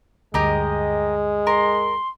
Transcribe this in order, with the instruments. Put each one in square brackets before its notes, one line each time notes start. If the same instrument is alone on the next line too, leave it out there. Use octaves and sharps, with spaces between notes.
[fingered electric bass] D2 G2 [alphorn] G#3 [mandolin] G4 A#4 D#5
[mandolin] A#4 [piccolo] C6